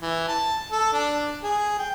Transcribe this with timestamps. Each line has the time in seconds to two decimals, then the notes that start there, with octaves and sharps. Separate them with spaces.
0.02 E3
0.28 A5
0.71 A4
0.93 D4
1.43 G#4
1.79 G5